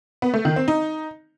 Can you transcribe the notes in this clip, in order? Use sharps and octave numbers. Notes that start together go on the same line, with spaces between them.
B3
A3
D#3
C4
D#4